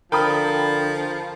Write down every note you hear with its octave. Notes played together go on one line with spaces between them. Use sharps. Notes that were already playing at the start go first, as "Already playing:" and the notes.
D3 F3 A#4 G5 B5 D#6